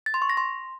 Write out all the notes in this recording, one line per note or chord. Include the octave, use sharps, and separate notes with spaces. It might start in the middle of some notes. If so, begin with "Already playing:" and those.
A6
C6
C#6
A#6
C6